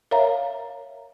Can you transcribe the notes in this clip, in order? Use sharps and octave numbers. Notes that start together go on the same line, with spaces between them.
A#4 C#5 E5 F5 A#5